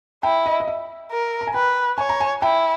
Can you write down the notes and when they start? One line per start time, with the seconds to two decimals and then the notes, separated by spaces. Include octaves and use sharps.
0.23 E4 G5
0.46 D#5
0.60 D#5
0.68 E5
1.12 A#4
1.41 A#5
1.47 G#5
1.54 B4 G5
1.98 C#5 G#5
2.09 A#5
2.20 G#5
2.42 E4 G5